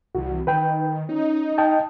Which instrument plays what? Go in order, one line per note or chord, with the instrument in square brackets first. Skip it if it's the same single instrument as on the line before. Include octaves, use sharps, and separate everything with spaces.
[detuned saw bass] C2 [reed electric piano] E3 F#4
[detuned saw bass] D#3 [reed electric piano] B4 G5
[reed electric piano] C#4 [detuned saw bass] D#4
[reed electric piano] D#5 G5 A5